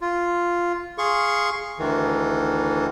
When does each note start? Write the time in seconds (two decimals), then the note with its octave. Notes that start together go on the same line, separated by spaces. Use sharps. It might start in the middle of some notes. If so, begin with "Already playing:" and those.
0.01 F4
0.98 G#4 F5 C6 C#6
1.79 D2 D#3 E3